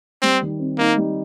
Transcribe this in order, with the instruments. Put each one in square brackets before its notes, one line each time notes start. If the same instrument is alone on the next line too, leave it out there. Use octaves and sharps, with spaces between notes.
[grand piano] G3 [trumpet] C4
[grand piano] D#3
C4
[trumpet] A#3 [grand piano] D#4
[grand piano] G3